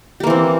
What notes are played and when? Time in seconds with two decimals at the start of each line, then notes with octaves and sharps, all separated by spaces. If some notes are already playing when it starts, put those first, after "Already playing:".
0.20 G4
0.23 A#3
0.27 E3
0.30 C4